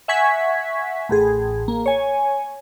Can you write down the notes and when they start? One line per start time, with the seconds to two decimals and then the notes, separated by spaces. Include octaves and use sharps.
0.08 E5 F#5 G#5 C#6 G#6 B6
1.09 A1 A2 G#4
1.68 A#3
1.86 C#5 G#5